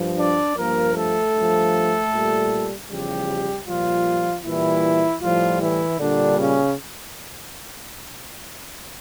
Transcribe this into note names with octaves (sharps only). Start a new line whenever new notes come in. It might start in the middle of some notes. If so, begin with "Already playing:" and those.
Already playing: G2 F3
D4 D5
G2 F3 A#3 A#4
A3 A4
G2 F3
A#2 G3
E2 C#3 F3 G3 G4
A#2 F3 G3 F4
A#2 E3 G3 E4
A2 F3 G3 F4
E3 E4
A#2 D3 G3 D4
C#3 C#4